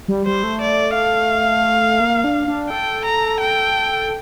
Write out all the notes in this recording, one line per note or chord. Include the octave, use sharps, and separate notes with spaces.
G3
G3 C5
A3
D5
F5
A#3
D4
D4
A4 G5
A#5
G5